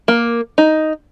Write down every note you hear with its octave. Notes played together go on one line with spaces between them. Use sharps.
A#3
D#4